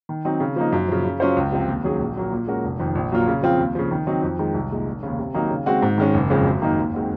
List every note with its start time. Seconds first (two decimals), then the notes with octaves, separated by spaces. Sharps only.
0.09 D#3
0.25 F#3 C4 D#4
0.40 C#3
0.56 F3 A#3 D#4
0.72 F#2
0.88 C#3 F3
1.04 C#3
1.20 F#3 C#4 F4 C5
1.37 C#2
1.52 C3 F3 C4
1.68 D#2
1.83 D#3 F#3 C#4 G#4
2.00 A#1
2.16 A#2 F#3 A#3
2.32 A#2
2.47 G#3 C#4 F#4 A#4
2.64 F1
2.79 F2 D#3
2.95 A#1
3.12 A#2 F#3 A#3 F4
3.28 C#3
3.43 F3 C4 F4
3.59 D#2
3.75 C#3 F3
3.91 D#3
4.07 F#3 C4 D#4
4.23 F2
4.39 D#3 G#3
4.54 C2
4.70 A#2 G#3 D#4
4.87 F1
5.03 D#2 C#3
5.19 C3
5.34 D#3 F#3 A#3 D#4
5.50 C#3
5.66 G#3 C4 F#4
5.82 G#2
5.98 D#3 G#3 C#4
6.14 F#1
6.30 F2 C#3 G#3 C4
6.46 F#2
6.62 D#3 A#3 D#4
6.78 D#2
6.93 D#3 G#3 C4 F#4